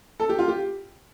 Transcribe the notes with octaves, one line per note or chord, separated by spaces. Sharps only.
A4
G4
F4
G4